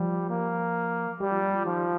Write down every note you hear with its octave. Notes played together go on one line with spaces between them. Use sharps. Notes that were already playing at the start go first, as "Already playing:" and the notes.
Already playing: F3 G3
A#3
G2 G3
F2
G2
F3
D#3 F3